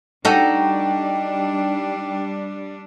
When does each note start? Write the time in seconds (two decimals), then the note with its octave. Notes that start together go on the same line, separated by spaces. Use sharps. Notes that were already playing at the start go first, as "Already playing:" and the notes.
0.25 G3 D4 D#4 F#4 A4 G5